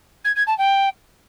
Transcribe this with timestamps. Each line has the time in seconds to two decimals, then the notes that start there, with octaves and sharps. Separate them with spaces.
0.24 G#6
0.36 G#6
0.47 A5
0.58 G5